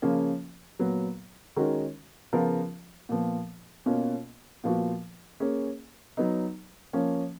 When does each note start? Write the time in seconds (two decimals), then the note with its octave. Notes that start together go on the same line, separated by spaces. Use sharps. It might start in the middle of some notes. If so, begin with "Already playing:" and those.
0.02 C#3 F3 A#3 C#4 F4
0.79 A#2 F#3 B3
1.56 D#3 G#3 C#4 F#4 A#4
2.33 C#3 F3 B3 F4 A#4
3.09 A#2 F3 B3
3.86 B2 A#3 C#4 F4
4.64 A#2 F3 B3 F#4
5.40 A#3 C#4 G#4
6.17 F#3 B3 D#4
6.93 F3 A#3 C#4